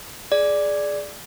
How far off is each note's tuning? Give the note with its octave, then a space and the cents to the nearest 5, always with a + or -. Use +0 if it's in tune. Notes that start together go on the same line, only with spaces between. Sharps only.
G#4 +10 D5 +0